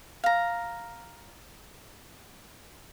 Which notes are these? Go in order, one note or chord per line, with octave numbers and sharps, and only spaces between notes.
F5 A#5